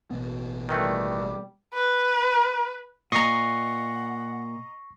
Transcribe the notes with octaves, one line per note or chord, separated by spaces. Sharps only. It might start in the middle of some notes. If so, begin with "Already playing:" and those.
A1 B2 B3
D#3 E3 G3 A3
B4
A#2 D#5 F#5 A#5 C#6 A#6 C7